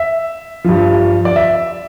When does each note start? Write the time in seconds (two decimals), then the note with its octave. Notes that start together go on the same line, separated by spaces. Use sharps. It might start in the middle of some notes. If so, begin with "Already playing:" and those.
Already playing: E5
0.65 G2 F3
1.25 D5
1.36 E5